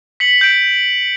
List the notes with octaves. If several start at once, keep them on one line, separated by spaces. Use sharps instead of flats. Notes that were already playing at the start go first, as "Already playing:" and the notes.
B6 C#7 F#7
G6 D7